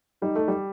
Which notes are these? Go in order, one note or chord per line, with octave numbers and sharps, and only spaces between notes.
G3 D#4
A3
G3